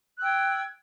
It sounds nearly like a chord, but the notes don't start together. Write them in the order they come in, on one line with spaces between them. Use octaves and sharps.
F#6 E6 G5 G#6